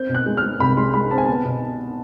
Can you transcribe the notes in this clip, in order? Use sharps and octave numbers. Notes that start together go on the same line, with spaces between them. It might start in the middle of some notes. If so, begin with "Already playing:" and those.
Already playing: C4 G6
B2
F#6
G#3
F6
G#3
C2 B5
G#3 C6
G#3 B5
C4 A5
G#5
B3 A5
B2